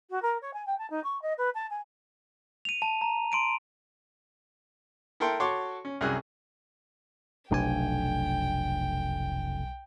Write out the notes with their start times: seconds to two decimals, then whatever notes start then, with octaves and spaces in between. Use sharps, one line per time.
0.10 F#4
0.22 A#4
0.42 C#5
0.54 G#5
0.66 G5
0.79 A5
0.90 D#4
1.04 C#6
1.22 D#5
1.38 B4
1.55 A5
1.70 G#5
2.65 D#7 F7
2.82 A5
3.01 A#5
3.32 C6 D7 D#7
5.20 E4 A4 A#4 G5 C6
5.40 F#4 A4 C#5 C6 D6
5.85 C#4
6.01 C2 F#2 G#4 F#6
7.51 F1 B1 A3 D4 G5 G#5